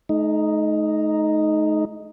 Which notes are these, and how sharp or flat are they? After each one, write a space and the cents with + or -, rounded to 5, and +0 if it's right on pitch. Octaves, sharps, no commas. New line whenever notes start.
A3 -45 D#4 +0